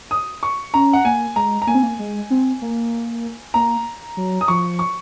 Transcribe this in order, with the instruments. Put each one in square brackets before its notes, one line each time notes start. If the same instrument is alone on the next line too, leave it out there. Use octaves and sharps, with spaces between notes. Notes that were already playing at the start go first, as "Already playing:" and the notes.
[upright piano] D#6
C#6
[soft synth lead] C#4 [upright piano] A#5
[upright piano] F#5
[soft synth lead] A#3 [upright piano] G#5
[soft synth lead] G#3 [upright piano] A#5
[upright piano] A#5
[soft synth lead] A#3 [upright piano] G#5
[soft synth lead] C4
A#3
G#3
C4
A#3
[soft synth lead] A#3 [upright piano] A#5
[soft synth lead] F#3
[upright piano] D#6
[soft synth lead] F3 [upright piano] C#6
[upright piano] C#6